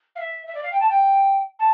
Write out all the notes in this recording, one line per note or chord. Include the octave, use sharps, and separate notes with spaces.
F5
E5
E5
D5
F5
G5
A5
G5
A5